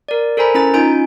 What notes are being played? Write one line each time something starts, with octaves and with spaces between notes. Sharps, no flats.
A#4 D5
A4 A#4 C5 G#5 A#5 B5
C#4 E4 A#5 A6
C#4 D#4 F4 G#5 G6 D7